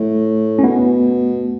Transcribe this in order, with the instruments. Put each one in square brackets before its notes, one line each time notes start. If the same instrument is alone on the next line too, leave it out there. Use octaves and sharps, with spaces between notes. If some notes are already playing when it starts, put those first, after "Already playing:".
Already playing: [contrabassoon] A2 [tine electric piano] A3
[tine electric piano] C#4
[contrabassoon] B2 [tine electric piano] B3